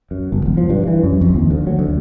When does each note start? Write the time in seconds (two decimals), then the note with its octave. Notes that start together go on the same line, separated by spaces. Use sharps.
0.11 F#2
0.32 G1
0.46 E1
0.57 F3
0.70 G2
0.87 E3
1.04 F#2
1.21 F2
1.35 D#2
1.51 D2
1.67 F#3
1.79 D2